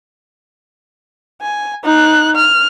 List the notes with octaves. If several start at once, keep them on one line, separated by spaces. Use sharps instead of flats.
G#5
D#4 F#6
F6